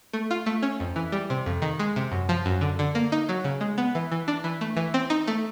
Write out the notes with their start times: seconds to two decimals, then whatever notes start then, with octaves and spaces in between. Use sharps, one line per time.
0.13 A3
0.31 F4
0.46 A3
0.63 C#4
0.80 F2
0.96 E3
1.12 G3
1.30 C3
1.46 F2
1.62 D#3
1.79 G#3
1.96 C3
2.12 F#2
2.29 F3
2.46 F#2
2.61 D3
2.79 D3
2.95 A#3
3.12 D#4
3.29 F#3
3.44 C#3
3.61 G#3
3.78 B3
3.95 E3
4.12 E3
4.28 D4
4.44 E3
4.61 A3
4.77 E3
4.94 C4
5.10 D#4
5.27 A3